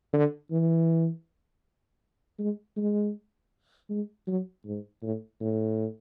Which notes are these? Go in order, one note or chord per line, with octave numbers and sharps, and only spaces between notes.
D3
E3
G#3
G#3
G#3
F#3
G#2
A2
A2